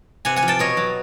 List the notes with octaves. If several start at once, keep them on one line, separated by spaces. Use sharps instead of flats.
C3 F#5 G#5
F#5 G#5
F3
G5 A5
B2 C#5 D#5
F#3